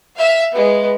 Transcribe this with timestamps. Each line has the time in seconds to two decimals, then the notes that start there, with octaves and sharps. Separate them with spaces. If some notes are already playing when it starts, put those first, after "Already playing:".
0.16 E5 F5
0.52 G#3 B3